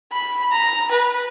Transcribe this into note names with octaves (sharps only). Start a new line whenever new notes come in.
B5
A#5
B4